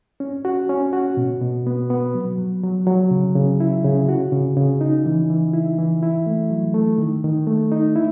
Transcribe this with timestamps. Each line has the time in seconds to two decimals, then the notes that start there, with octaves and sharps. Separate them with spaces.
0.20 C#4
0.45 F#4
0.69 C#4
0.93 F#4
1.17 B2
1.41 B2
1.67 B3
1.90 B3
2.15 F#3
2.38 F#3
2.63 F#3
2.87 F#3
3.11 C#3
3.35 C#3
3.60 E4
3.84 C#3
4.09 F#4
4.32 C#3
4.57 C#3
4.81 D#4
5.06 E3
5.30 E3
5.54 E4
5.78 E3
6.03 E4
6.26 A3
6.51 F#3
6.74 A3
6.98 D#3
7.24 D#3
7.47 A3
7.72 D#4
7.96 E4